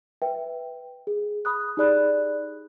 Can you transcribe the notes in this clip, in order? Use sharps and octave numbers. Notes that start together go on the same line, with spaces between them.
B4 E5 G5
G#4
B5 D#6 F#6
D#4 G4 G#4 D5 B5 F#6